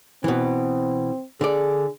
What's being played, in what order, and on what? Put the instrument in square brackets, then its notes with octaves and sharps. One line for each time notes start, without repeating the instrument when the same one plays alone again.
[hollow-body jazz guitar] B2 E3 [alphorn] C4
[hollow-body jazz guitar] D3 D5 [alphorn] G#4